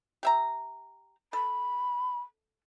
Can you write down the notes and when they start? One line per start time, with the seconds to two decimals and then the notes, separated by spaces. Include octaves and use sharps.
0.23 G4 E5 A#5
1.33 A4 B5